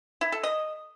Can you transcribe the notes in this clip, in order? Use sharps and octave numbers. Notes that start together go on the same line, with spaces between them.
E4
A4
D#5